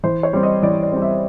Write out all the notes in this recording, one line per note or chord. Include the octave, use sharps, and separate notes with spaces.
E3 C5
C#5
G3 C4
D#5
E3 D5
D5
G3 C4
E5